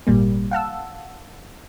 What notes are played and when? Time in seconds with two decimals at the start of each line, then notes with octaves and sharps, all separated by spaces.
0.07 G#1 A#2 G3 A#3
0.51 F5 F#5 A5 E6